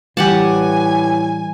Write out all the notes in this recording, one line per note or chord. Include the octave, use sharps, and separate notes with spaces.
A2 E3 G3 G4 F#5 G#5 A5